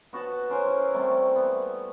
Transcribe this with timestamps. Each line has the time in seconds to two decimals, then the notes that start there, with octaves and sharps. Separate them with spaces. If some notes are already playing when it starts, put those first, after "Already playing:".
0.13 B3 F#4 B4 A5
0.49 C#4 A#4 C5 G#5
0.66 E4
0.94 C3 G3 A3
1.36 B3